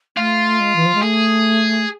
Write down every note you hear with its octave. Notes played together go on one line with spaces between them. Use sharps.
A3 F4
G#3
E3
F3
G#3
A3 G#4